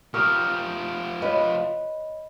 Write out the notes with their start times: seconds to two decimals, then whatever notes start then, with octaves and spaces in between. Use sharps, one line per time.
0.14 F3 G4 A#4 C#6 D#6
1.22 B4 C#5 D#5